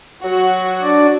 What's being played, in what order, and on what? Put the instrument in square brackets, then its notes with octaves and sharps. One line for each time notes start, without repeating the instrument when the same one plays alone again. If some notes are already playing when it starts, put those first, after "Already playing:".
[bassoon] F#3 [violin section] F#4
[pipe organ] D4 D5